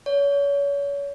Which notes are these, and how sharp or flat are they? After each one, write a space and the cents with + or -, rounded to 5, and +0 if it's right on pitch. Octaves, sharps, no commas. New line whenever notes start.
C#5 +35